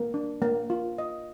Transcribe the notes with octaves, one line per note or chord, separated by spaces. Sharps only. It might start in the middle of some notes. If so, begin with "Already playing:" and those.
Already playing: A#3
D4
A#3
F4
D#5